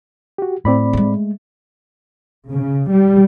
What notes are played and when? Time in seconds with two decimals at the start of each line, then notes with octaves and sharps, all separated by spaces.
0.38 F#4 G4
0.65 A2 C4 D5 B5
0.93 G#3 A3
2.53 C#3
2.91 G3